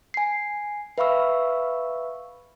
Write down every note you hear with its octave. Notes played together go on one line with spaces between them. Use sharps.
G#5 C7
B4 E5 F5 B5 C#6 E6